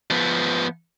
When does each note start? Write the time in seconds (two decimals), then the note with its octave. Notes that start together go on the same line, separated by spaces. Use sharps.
0.10 F3 B3